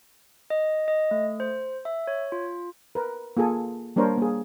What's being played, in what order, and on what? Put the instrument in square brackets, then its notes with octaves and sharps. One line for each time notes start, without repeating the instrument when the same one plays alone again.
[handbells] D#5
D#5
A3
C5
E5
C#5
F4
[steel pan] A#4 B4
A#3 F4 G#4 A4 G#5
G3 A#3 D4 A#4 C5 C#5
A#3 G#4